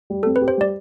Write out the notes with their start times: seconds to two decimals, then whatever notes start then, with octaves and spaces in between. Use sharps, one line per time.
0.10 G3
0.23 C4 A4
0.36 B4
0.42 G4
0.48 C5
0.57 G3 D5